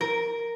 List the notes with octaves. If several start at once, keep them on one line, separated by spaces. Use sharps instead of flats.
A#4